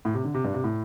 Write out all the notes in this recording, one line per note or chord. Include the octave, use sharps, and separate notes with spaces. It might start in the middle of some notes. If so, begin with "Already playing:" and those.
A2
C3
D3
C3
G2
C3
A2